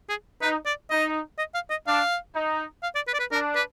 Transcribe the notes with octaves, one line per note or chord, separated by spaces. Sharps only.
G#4
D#4 B4
D5
D#4 D#5
D#5
F5
D#5
D4 F5
D#4
F5
D5
B4
D5
B4
D4 A#4
B4